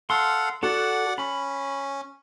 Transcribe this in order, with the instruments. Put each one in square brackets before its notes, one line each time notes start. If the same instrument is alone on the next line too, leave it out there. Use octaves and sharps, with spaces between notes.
[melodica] A4 F5 F#5 [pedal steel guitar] C6
[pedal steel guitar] F#4 A4 [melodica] D5 F#5
[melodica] C#4 [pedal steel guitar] B5